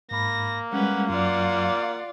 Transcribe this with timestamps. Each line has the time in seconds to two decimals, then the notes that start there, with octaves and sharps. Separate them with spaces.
0.11 G#2 A#3 B5 A#6
0.73 G3 G#3 C#4 B4 F#5
1.10 F#2 F#3 F4 D5 F#5 D6